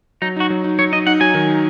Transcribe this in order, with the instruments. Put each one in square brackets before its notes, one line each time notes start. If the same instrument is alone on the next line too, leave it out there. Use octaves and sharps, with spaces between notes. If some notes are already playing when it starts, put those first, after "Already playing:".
[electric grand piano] F#3 [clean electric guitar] D#4
[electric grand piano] D#4 [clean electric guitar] F#4
[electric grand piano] F#3
D#4
[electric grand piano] F#3 [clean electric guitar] C#5
[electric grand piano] D#4 [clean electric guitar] D#5
[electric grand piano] D#4 [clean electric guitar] F#5
[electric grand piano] F#3 [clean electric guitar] G#5
[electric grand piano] D#3